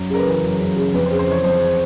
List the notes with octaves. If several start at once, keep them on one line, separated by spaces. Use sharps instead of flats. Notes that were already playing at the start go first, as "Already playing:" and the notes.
Already playing: F#2
C#3 A#4
B4
E3
F#2
F#2
C#3
F2 B4
C5
C#3
C5
E3 C#5
F2 C5